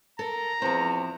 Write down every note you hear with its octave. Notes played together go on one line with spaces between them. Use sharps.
A4 A#4 A#5
E2 F3 C4